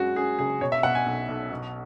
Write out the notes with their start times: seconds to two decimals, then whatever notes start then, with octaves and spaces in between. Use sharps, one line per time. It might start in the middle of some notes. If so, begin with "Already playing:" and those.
Already playing: F#2 G#3 F#4
0.16 F#2 G#4
0.39 F#1 G#4
0.61 B2 C#5
0.72 E5
0.83 B2 F#5
0.95 G#5
1.06 B1
1.28 B1
1.51 B2